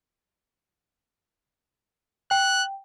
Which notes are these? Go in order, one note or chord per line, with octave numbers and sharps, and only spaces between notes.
G5 F#6